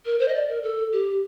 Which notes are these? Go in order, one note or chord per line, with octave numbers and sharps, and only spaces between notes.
A#4
C5
D#5
D5
A#4
A4
G4